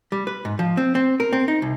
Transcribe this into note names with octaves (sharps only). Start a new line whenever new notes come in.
G3
B4
G#2
F3
C4
C4
A#4
C4
D#4
C2